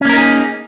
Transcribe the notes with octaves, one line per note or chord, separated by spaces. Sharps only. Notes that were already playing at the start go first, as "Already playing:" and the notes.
A#3 C#4 D#4 G#4 A#4